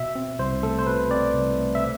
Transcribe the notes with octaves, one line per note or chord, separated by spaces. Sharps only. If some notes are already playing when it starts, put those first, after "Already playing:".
Already playing: B2 E5
C4
C2 C5
A3 A4
C5
B2 B4
C4 D5
C2
A3
E5